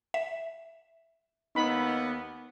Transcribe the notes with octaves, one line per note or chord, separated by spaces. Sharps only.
E5
D#2 B3 D#4 B5